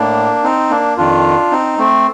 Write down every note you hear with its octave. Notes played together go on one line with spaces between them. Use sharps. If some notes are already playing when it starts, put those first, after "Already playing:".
Already playing: A2 A#3 D4
C4 D#4
A#3 D4
F2 D#3 D4 F4
C4 D#4
A3 C4